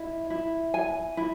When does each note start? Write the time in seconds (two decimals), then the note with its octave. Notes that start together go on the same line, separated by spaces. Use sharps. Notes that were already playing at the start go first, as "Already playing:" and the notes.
Already playing: E4 D#5
0.30 E4
0.74 G#5
1.17 E4